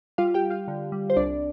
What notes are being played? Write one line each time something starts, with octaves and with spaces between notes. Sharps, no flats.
G3 F4 F5
G4 G5
G3
F4 F5
D3
G3
C5
C2 D4 D5